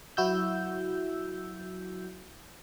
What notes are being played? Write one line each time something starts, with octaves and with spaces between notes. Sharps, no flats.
F#3 E4 F#4 E6 G6